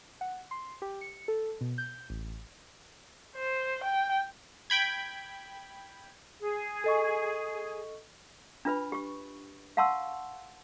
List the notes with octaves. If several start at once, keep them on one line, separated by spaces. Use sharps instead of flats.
F#5
C6
G4
C#7
A4
B2
G6
A1
C5
G5
G5 B5 G#6
G#4
A4 D#5 C#6
D4 F4 B4 B5
G4 C#6
F5 F#5 A5 C6 C#6 E6